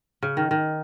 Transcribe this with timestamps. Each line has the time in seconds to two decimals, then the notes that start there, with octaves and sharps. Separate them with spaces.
0.22 C#3
0.37 D#3
0.51 D#3